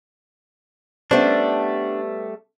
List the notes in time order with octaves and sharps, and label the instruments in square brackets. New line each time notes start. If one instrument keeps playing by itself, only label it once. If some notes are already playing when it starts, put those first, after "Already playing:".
[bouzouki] G3 A3 [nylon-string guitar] B3 C#4 C5 [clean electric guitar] D4